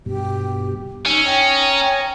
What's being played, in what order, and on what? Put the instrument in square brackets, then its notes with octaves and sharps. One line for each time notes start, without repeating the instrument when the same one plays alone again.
[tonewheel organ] G2 B2 [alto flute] G4
[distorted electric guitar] C#4 [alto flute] D#4 [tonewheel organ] E6
[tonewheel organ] C#5 A#5 D#6 [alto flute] G5